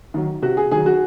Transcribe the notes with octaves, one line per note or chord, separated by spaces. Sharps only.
D#3 F#3
C3 F#4
G#4
D#3 F#3 G#4
F#4